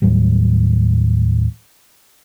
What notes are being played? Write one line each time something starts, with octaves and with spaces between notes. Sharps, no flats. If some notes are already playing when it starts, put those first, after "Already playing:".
D#2 A2 F#3 G3